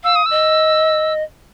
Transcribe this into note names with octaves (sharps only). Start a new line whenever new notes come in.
F5 E6
D#6
D#5 E6